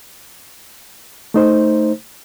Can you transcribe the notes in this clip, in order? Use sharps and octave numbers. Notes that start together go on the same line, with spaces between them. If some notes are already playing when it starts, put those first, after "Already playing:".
A3 D#4 C5